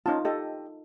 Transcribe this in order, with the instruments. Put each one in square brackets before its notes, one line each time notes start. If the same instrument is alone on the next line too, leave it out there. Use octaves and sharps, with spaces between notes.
[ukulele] C#4 A5 [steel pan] D#4 F4
[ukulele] G4 D#5 [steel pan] A4